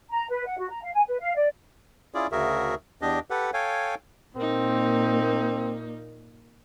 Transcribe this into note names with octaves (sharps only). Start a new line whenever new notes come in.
A#5
B4
F#5
F#4
A#5
F5
G#5
B4
F5
D5
C#4 E4 F4 G#4 D5
D2 C#3 F#4 G#4 A#4 E5
E2 D4 G4 D#5
G4 A4 B4 F#5
A4 C#5 F5 G5 G#5
A#2 A#3 C4 D#4